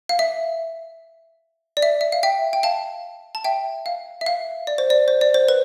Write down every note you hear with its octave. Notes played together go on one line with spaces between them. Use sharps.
F5
E5
D5
E5
E5
F5
E5 G5
G5
F5 A5
A5
E5 G5
F5
E5
F5
D5
C5
D5
C5
D5
C5
B4